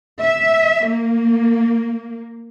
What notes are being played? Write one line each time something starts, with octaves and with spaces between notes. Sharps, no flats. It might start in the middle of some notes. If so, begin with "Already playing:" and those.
E5
A#3